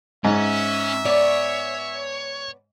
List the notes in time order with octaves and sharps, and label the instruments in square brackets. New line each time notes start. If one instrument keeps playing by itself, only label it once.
[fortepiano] G#2 [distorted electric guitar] C#4 [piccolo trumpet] E5
[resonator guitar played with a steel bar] B3 D5 [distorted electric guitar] C#5